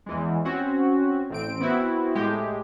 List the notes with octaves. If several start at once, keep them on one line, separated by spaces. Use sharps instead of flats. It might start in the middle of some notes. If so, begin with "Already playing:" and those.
E2 E3 G#3
C4 C#4 F#4
A1 C4 D7
B3 C4 E4 F#4
A2 G#3 G4